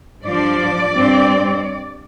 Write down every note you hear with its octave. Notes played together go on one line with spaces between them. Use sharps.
G2 F3 D4 D5
G2 G3 C4